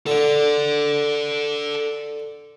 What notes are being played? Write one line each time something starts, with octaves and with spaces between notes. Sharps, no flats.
D3 A4 D5